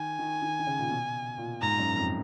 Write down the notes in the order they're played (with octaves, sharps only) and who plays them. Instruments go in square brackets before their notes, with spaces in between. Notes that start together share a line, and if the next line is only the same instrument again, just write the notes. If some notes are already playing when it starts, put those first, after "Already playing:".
Already playing: [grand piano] D#3 [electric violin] G#5
[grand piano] D#3
D#3
D#3
C#3
A#2
B2
A#2
[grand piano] G#2 [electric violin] A#5
[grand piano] F#2
F2